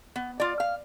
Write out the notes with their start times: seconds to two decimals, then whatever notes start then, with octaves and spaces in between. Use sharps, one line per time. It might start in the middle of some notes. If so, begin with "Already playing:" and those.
0.16 B3
0.40 F4 D5
0.60 F5